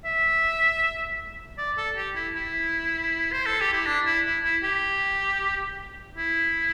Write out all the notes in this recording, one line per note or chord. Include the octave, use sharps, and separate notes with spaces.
E5
D5
A4
G4
E4
E4
C5
A4
G4
E4
D4
E4
E4
E4
G4
E4